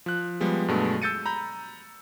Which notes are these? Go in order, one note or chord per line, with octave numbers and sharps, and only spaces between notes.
F3 F#6
F3 G3 G#3 B3
G2 B2 F#3 G#3 A3
E6 G6 A6 C#7 D#7
A#5 B5 G6